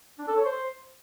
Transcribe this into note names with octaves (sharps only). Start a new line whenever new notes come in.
D4
A4
C#5
C5